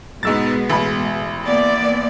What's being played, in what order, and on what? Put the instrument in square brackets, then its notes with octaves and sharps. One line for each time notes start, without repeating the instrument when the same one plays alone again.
[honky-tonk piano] G#2 E6 A6 [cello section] B2 G#3 B3
[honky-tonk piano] A1 B5
[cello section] A#3 B3 D5